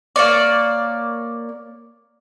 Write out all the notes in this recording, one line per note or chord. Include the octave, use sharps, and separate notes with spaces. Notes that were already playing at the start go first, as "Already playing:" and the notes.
A#3 C#5 D5